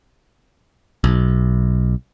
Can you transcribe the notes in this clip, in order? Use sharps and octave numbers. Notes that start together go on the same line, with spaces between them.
B1